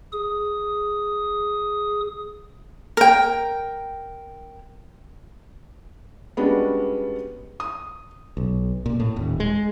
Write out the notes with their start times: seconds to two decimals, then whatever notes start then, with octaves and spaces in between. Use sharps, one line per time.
0.12 G#4 D#6
2.97 A#4 G5
6.37 G3 G#3 B3 C#4 D4 F#4
7.60 D#6
8.37 B1
8.86 A#2
9.00 A2
9.16 D#1
9.40 G#3